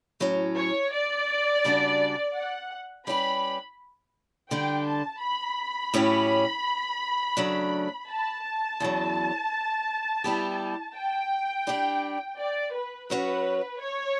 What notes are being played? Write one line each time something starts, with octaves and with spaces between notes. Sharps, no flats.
A2 F#3 C#4
C#5
D5
C#3 G3 D4 F#4
F#5
G3 C#4 E4 G4 B4 B5
D3 G3 D4 G5
A5
B5
A2 F#3 C#4 G4 C#5
C#3 F#3 A3 D4
A5
E2 C#3 F#3
G3 B3 E4 G4
G5
G3 D4 G4 D5
D5
B4
F#3 C#4 F#4 B4 C#5
C#5